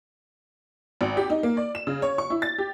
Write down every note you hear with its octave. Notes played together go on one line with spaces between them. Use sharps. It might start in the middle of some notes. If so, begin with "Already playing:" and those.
G#1
G4
D#4
A#3
D5
E7
C#3
C#5
C#6
E4
A6
G4